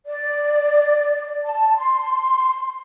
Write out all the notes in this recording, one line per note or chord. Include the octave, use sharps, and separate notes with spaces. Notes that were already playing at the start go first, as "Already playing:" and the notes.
D5
A5
C6